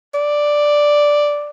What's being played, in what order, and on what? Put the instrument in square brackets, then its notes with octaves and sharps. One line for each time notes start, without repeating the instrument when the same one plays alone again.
[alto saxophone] D5